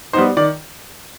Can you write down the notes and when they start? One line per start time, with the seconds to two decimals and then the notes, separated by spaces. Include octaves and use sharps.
0.13 G3 B3 D#4 C5
0.37 D#3 D5